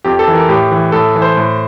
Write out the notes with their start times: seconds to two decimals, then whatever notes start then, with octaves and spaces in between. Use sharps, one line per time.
0.04 F2 G4
0.19 A4
0.28 E3
0.34 A#4
0.49 A2 G4
0.72 E3
0.92 A2 A4
1.15 E3
1.22 C5
1.37 A2